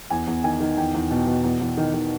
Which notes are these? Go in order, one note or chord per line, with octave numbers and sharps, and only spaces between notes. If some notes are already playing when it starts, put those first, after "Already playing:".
E2 G#5
E2
D#3 G#5
D#3
E2 G5
E2
B2
B2
E2
E2
D#3
D#3